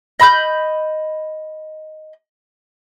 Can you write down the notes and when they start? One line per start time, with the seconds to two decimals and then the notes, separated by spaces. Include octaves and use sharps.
0.20 D#5 B5 D#6 G6